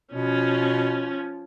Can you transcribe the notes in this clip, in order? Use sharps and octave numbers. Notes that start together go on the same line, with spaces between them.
B2 F3 C#4